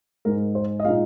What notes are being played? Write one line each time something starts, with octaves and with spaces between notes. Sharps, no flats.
G#2 G#3 D#4 A#4
C5
D#5
A#2 G#3 D#4 F5